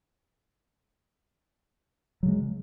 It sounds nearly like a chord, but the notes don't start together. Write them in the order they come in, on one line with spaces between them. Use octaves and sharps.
F#3 C#3 G#3